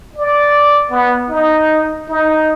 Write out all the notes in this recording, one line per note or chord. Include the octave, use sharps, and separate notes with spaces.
D5
B3
D#4
D#4